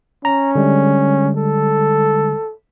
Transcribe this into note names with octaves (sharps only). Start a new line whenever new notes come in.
C#4 A#5
D3 G3 G#3
A4